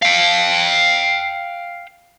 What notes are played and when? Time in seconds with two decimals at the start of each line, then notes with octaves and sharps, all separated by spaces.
0.03 F5 G5